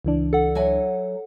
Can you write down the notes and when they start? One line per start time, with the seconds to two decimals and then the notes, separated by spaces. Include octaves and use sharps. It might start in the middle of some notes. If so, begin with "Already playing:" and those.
0.05 C#2 E3 D4
0.33 A4 F#5
0.55 F#3 E5 G#5